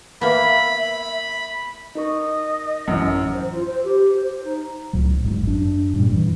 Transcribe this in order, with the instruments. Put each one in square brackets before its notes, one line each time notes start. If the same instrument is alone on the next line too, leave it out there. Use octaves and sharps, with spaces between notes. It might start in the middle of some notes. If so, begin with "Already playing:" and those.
[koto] A#3 B3 [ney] E5 [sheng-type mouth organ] B5
[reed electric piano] D#4 A#4 C#6 [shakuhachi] D#5
[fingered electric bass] A1 E3 [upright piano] F#2
[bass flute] C5
F4
C5
G4
C5
D#4
[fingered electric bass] C#2 A2 F#3
G1 G#2
F#2 D4
G2 A#2 G3
F2 E3